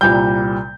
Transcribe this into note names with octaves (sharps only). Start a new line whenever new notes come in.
C2 A#2 G3 G6